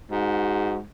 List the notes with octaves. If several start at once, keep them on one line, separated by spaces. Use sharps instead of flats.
G#2 F#4